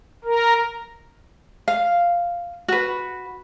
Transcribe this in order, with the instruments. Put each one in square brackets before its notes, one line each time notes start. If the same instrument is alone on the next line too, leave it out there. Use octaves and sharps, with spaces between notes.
[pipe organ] A#4
[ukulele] F5
F#4 B4